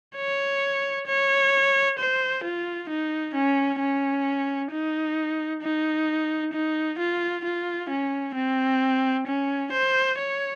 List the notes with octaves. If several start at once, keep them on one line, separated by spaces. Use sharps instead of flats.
C#5
C#5
C5
F4
D#4
C#4
C#4
D#4
D#4
D#4
F4
F4
C#4
C4
C#4
C5
C#5